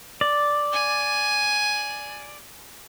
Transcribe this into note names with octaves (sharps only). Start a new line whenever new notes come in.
D5
G#5